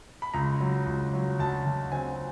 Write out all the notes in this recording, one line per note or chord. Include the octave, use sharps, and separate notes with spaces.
B5
C#2 A#5
F#3
C#2
F#3
D2 A5
D2
C4 G#5